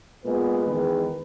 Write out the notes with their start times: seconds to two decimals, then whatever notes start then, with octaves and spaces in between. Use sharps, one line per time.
0.25 A#2 G#3 B3 B4
0.65 E2 D#3 G#3